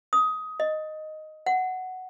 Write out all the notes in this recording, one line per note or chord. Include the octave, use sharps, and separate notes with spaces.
D#6
D#5
F#5